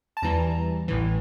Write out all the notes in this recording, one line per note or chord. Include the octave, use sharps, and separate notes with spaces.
A5
E2 E3 G3 A#5
A1 A2 E3